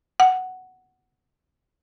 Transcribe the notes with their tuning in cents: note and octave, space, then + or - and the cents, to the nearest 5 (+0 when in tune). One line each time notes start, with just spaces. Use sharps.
F#5 +5